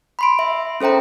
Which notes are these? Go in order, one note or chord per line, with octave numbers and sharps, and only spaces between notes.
B5 C6 D7
E5
C#4 A4 C5 G5 A#5